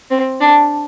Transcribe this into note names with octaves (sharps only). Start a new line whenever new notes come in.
C4
D4